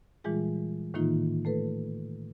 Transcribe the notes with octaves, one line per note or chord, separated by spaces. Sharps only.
A#2 E3 G3 G#3 F4 G#4
A2 D#3 E3 A#3 D#4 F4
A3 A4 B4